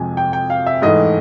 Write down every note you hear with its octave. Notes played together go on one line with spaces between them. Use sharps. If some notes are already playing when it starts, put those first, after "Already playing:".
Already playing: F2 C3 F3 G#3 G#5
G5
G5
F5
E5
G#2 E3 A3 D#5